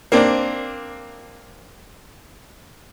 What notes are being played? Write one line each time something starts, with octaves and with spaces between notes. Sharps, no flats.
A#3 C4 D4